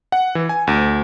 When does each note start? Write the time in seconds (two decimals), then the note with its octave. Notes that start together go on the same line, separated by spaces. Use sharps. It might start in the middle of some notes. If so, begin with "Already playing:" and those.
0.12 F#5
0.35 E3
0.49 G#5
0.67 D2